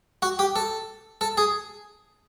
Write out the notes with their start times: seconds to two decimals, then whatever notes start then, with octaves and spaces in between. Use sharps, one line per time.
0.22 F#4
0.39 G4
0.56 A4
1.21 A4
1.38 G#4